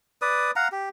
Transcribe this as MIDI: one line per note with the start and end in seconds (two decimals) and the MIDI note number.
0.22 0.51 71
0.22 0.51 74
0.22 0.51 87
0.56 0.68 77
0.56 0.68 78
0.56 0.68 82
0.72 0.89 67